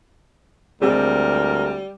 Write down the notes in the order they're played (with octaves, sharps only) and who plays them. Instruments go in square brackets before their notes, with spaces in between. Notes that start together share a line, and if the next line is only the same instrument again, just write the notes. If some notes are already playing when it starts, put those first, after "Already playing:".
[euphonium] D2 [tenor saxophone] G3 [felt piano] G#3 C4 G4 [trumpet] A#4